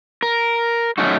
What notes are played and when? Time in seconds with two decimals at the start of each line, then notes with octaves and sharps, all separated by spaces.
0.23 A#4
0.98 F#2 A3 C#4 D#4 F#4